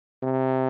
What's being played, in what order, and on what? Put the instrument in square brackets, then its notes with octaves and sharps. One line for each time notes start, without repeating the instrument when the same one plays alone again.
[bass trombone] C3